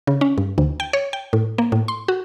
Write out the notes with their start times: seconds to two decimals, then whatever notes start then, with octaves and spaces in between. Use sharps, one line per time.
0.07 C#3
0.21 C#4
0.38 G2
0.58 D2
0.80 G5
0.93 C#5
1.13 G5
1.33 A2
1.58 A#3
1.72 A2
1.88 C6
2.08 F#4